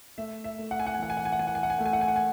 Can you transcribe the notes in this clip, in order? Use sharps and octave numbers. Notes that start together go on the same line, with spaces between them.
A3 E5
E5
A3
F#5
G#5
F#5
G#5
E3 F#5
G#5
F#5
G#5
F#5
E3 G#5
F#5
G#5
F#5
G#5
A3 F#5
G#5
F#5
G#5
F#5
G#5